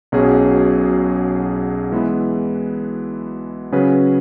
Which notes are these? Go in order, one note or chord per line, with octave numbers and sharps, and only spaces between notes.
B1 B2 F#3 C#4 G#4
E3 G#3 B3 E4 B4
C#3 F#3 C#4 G#4 B4